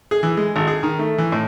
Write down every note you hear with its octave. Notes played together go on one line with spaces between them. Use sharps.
G#4
E3
G#3
G#1
G#4
D#3
A3
E3
A2